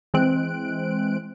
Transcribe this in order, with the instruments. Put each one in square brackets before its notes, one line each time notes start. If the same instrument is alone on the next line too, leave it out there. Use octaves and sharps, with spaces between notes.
[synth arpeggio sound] E3 G#3 C4 F#6 D7